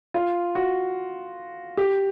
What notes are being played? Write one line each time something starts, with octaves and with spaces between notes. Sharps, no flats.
F4
F#4
G4